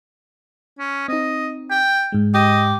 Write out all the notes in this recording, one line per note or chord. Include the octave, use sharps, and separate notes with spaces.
C#4
C4 D#4 D#5
G5
G#2 G#3
G4 D#5